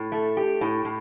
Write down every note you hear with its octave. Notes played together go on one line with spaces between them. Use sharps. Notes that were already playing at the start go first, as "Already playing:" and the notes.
Already playing: A2
A3
G4
A2
A2